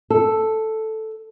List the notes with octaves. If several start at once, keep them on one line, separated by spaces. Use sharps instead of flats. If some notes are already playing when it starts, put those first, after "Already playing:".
A4